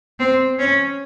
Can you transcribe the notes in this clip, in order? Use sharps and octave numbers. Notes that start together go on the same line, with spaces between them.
C4
C#4